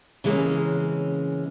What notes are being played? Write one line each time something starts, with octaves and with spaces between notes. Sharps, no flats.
C#3 E3 G#3 A#3 C4 C#4